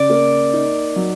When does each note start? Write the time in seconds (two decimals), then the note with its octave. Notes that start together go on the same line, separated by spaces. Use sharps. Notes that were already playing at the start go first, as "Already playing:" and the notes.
Already playing: C#3 D5
0.10 A#3
0.53 D#4
0.96 F#3